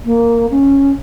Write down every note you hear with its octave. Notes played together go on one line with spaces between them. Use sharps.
A#3
C#4